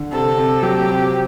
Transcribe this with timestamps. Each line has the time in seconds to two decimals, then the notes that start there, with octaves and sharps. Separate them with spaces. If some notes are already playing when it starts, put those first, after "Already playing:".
Already playing: D3
0.12 C3 A4
0.38 C3
0.63 F#3 G4
0.89 C3